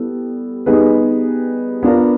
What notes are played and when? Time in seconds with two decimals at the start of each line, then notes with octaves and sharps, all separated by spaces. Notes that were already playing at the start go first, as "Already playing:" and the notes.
Already playing: G3 B3 E4 A4
0.66 G3 B3 D#4 G#4 B4
1.83 B3 D4 F4 A#4